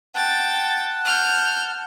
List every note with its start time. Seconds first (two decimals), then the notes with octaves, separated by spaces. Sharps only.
0.15 F#5 G5 A5 A6
1.05 F6 G6